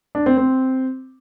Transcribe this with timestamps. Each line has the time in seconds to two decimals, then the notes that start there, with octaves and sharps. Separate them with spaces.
0.15 D4
0.26 C4
0.38 C4